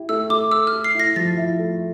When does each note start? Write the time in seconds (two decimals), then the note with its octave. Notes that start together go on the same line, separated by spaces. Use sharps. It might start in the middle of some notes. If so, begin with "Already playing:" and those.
Already playing: E4 G4
0.09 A3 E6
0.30 A3 D6
0.51 A4 E6
0.67 F6
0.73 A3
0.84 C7
0.94 E4
1.00 A#6
1.16 F3 A6
1.37 E4
1.59 A3